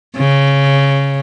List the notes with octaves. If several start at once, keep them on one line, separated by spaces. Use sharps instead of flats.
C#3